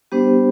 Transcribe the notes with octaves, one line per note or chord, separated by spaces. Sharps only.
G3 B3 D4 G4 C5